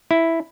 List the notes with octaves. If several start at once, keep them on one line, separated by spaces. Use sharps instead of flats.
E4